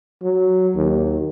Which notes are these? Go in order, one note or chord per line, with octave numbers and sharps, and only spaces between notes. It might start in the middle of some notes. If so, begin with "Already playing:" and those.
F#3
D#2